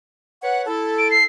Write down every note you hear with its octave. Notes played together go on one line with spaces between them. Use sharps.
B4 C#5 F#5
E4 A4
D7
C7